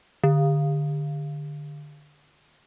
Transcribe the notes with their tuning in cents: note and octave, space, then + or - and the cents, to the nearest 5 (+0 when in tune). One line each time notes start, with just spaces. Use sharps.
D3 +15